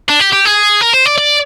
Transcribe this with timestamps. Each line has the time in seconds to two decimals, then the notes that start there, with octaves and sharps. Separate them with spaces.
0.09 D4
0.20 G4
0.32 G4
0.45 G#4
0.81 A#4
0.93 C5
1.05 D5
1.18 D5